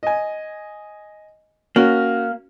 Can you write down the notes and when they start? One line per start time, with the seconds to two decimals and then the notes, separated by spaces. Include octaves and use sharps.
0.03 D#5 G#5
1.76 A#3 C#4 F#4